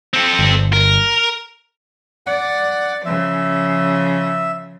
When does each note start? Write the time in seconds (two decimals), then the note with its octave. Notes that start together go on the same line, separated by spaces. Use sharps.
0.13 C4 A4
0.39 G1
0.73 A#4
2.26 D5 F#5
3.05 C#3 F3 E5